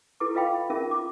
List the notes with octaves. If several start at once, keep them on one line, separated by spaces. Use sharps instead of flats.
E4 G4 A4 B4 D6
F4 B4 D#5 F5 G5 B5
C#4 D#4 F4 G#4 A#4 E5
F4 D6